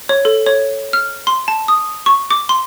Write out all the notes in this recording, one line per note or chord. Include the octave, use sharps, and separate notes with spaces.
C#5
A4
C#5
F6
C6
A5
D#6
C#6
D6
C6